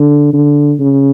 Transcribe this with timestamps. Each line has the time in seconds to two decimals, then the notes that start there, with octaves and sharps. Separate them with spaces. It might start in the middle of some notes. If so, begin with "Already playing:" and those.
Already playing: D3
0.33 D3
0.80 C#3